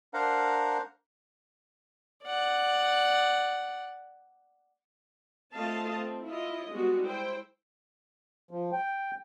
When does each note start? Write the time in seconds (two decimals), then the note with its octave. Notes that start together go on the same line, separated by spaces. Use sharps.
0.14 D4 A#4 C5 F5 F#5 A#5
2.24 D5 F#5
5.53 A3 C4 F4 D#5 F5 A5
5.94 C4
6.26 E4 F4 D#5
6.72 G3 G#3 B3 F#4
7.03 E4 C5 G5
8.51 F3
8.73 G5